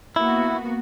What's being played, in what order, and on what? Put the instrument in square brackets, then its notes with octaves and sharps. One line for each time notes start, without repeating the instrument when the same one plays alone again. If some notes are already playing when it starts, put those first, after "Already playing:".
[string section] A#3 B3 F#4 [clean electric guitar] E4